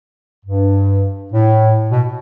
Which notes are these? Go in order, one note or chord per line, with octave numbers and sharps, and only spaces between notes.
G2
A2
B2